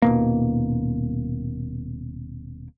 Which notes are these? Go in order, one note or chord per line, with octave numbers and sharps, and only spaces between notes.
D#1 B2 A#3